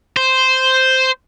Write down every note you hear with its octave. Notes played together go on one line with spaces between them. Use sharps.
C5